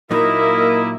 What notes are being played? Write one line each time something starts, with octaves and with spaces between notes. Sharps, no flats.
A#2 F#3 A#3 D#4 E4 A#4 D#5